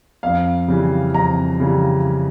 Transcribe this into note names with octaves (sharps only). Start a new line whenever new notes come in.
F2 F5
C#3 E3 G3
F2 A#5
C#3 E3 G3